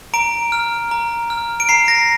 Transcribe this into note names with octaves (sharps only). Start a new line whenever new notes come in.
A#5 D7
F6
A#5
F6
D7
A#5 C7
A#6